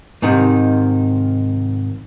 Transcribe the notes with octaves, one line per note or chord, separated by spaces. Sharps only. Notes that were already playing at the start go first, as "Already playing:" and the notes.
G#2 C3 D#3